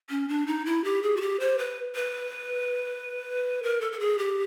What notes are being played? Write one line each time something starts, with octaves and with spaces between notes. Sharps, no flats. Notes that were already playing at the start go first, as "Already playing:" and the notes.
C#4
D4
D#4
E4
G4
G#4
F#4
G4
C5
B4
B4
A#4
A4
A4
G#4
G4